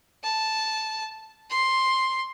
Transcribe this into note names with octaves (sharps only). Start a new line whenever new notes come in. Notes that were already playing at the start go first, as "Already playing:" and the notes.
A5
C6